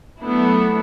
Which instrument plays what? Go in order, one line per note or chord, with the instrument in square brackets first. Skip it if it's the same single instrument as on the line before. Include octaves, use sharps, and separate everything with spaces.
[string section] F#3 A3 B3 D4 E4